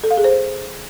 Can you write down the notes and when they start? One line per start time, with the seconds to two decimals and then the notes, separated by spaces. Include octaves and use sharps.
0.04 A4
0.11 F5
0.17 G#4
0.24 C5